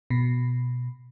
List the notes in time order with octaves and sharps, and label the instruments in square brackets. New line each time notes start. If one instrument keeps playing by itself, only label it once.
[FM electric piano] B2